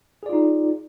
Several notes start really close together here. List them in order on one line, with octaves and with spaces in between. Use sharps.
G#4 D5 F4 D#4